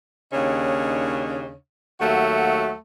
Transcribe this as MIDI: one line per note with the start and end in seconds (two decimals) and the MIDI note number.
0.33 1.53 39
0.33 1.53 49
0.33 1.53 62
0.33 1.53 63
0.33 1.53 73
2.00 2.73 39
2.00 2.73 54
2.00 2.73 57
2.00 2.73 66
2.00 2.73 76
2.00 2.73 78